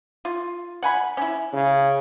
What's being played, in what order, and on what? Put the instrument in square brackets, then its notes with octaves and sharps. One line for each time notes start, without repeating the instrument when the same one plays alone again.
[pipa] F4
F#5 G#5 B5
C#4 E4
[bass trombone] C#3